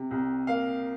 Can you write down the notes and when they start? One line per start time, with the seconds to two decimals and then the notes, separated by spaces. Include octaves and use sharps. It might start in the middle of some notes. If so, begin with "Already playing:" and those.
Already playing: C3
0.11 C2
0.47 A#3 F5